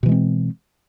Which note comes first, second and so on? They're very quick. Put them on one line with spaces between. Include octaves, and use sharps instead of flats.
B2 E3 G#3 C4